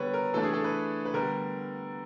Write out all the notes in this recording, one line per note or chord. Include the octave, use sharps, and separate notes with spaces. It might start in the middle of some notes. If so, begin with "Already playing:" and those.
Already playing: D3 G3 B3 B4 C#5
A#4
E3 A3 D4 A4
G#4
A4
B4
B4
D3 G3 B3 A#4